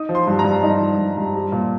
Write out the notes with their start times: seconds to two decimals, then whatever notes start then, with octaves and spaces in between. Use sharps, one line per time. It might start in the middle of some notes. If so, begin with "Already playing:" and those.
Already playing: D#4 D#6
0.09 F3
0.15 C6
0.27 G2
0.39 A#5
0.44 G2
0.63 D#4
0.81 F3
0.98 G2
1.17 G2
1.35 G3
1.52 A#2